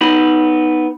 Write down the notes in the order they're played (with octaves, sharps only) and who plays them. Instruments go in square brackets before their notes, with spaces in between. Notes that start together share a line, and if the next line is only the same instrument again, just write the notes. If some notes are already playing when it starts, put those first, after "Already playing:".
[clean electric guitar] B3 D#4 B5